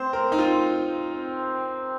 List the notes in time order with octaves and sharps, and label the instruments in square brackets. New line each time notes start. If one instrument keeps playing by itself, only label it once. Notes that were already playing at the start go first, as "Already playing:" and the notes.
Already playing: [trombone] C4 [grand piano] C5
[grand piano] A#4
D#4
F4
[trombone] C4